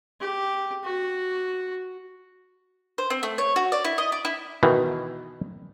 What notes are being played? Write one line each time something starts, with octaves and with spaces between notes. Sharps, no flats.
G4
F#4
C5
C4
A3
C#5
F#4
D5
E4
D#5
D5
E4
B2 D#3 E3